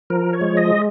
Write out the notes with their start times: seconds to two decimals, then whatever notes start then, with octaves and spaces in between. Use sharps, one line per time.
0.10 F3 A#4
0.33 C#5
0.41 G#3
0.57 D#5